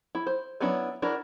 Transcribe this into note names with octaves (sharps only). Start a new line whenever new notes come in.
E4
C5
F#3 B3 C#4 D4 E4
D4 E4 F#4 A#4